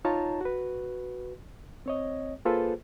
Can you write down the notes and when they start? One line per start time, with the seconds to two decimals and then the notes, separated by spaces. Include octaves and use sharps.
0.05 D#4 F4 C#5 A5 A#5
0.41 F#4 B4
1.86 C4 C#5 D#5
2.45 A#3 F4 G#4 A4 B4 C5